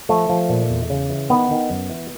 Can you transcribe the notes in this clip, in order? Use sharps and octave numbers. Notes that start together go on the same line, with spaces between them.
F3 A3
F3
A#2
E2
C#3
E3
D#3 B3
D#3
F#2
E3